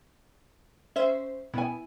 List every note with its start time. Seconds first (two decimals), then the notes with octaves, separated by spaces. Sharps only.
0.96 C#4 C5 E5
1.54 B2 B3 E4 G#5